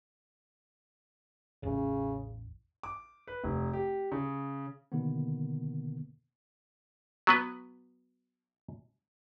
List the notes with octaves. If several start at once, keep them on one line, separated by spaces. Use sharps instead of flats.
A1 E2 C#3 C#4
D6
B4
F1
G4
C#3
B2 D3 D#3 A#3 B3
F#3 B3 B4